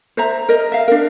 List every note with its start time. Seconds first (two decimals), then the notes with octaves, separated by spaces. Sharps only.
0.17 C5 E5 A#5
0.49 A#4 D#5
0.72 E5 F5
0.88 D4 A#4